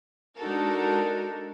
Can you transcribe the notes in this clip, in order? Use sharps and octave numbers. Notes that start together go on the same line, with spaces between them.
G#3 D4 D#4 F#4 A4 A#4